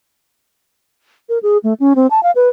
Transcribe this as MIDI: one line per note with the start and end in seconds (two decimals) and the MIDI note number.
1.29 1.38 70
1.43 1.58 68
1.64 1.73 57
1.80 1.93 61
1.96 2.07 60
2.10 2.23 81
2.23 2.31 77
2.35 2.49 71